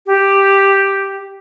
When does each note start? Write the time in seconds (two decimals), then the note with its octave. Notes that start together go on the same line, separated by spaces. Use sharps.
0.06 G4